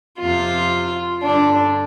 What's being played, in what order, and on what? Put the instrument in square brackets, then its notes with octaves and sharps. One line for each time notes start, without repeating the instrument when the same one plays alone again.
[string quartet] F2 C3 F4
G2 D3 D4